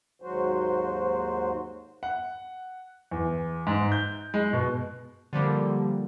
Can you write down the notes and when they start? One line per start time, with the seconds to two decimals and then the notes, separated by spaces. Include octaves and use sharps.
0.22 D#2 G#2 F#3 F#4 C5
2.03 F#5
3.11 E2
3.67 G#2
3.92 G6
4.34 G#3
4.53 B2
5.33 D3 F3 G3 A#3